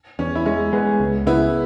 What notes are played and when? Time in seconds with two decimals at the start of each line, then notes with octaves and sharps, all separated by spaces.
0.19 E2 C#4
0.35 E4
0.45 G#3 C#4
0.73 G#3 B3
1.00 C#2
1.27 C#3 B3 E4